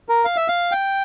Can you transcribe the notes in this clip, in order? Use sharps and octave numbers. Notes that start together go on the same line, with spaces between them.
A#4
F5
E5
F5
G5